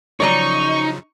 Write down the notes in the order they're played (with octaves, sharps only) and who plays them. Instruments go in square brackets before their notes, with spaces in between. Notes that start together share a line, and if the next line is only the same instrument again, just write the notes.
[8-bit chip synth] C#3 F3 F#3 [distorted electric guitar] D#4 [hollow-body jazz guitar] C#5 D5 A#5 [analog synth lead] C#6